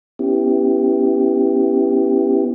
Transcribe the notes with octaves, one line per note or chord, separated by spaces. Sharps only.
B3 C#4 E4 G4